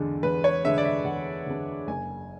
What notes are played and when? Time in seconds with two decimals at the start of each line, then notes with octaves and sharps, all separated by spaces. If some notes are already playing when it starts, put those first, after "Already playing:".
Already playing: E2 D3 G#3 D4
0.23 E2 B4
0.44 C#5
0.65 D3 G#3 D4 E5
0.78 D5
0.85 E5
1.05 E2 F#5
1.46 D3 G#3 D4
1.88 F#1 G#5